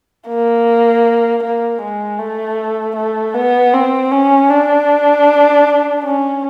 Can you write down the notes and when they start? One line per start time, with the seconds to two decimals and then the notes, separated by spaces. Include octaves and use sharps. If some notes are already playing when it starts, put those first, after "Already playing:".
0.28 A#3
1.43 A#3
1.81 G#3
2.19 A3
2.96 A3
3.34 B3
3.74 C4
4.12 C#4
4.50 D4
6.04 C#4